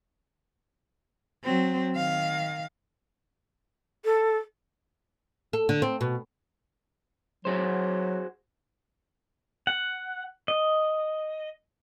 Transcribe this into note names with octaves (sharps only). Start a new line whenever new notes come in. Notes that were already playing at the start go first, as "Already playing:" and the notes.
F#3 C4
D#3 F5
A4
A4
D3
C4
B2
F#3 F#4 G#4 C5
F#5
D#5